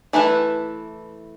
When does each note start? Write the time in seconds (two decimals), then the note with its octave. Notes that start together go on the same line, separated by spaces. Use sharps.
0.13 E3 A3 E4 B4